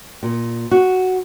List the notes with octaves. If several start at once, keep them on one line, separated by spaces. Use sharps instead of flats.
A#2
F#4